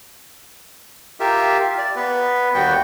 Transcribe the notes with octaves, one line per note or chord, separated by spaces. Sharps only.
F4 G4 A#4 E5
D5
B3 B4
D#2 G3 F#4 G5